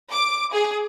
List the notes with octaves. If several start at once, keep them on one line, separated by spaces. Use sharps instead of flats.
D6
G#4